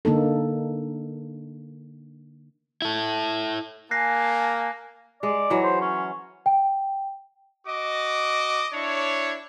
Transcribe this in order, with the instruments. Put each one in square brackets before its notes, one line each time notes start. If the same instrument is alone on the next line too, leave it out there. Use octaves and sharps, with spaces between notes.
[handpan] D3 A#3 D#4 A4
[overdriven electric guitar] E4 A4
[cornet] A#3 [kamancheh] G#5 A5 [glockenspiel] F#6 A#6 C7
[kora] G#3 [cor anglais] D5
[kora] E3 F#3
[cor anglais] C5
C#4
[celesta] G5
[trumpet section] F#4 D#5 D6
D4 E4 C#5